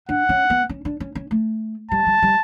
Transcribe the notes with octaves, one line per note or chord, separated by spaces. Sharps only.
D4 F#5
C#4
B3
C#4
D4
C#4
C#4
A3
G3 A5
G3
G3